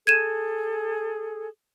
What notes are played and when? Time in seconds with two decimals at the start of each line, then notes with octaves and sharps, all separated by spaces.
0.07 G#4 A4 G#6 D#7 E7